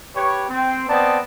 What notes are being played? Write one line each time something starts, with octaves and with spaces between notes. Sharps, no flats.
G4 B4 C#5
C4
B3 C4 D5 D#5 A5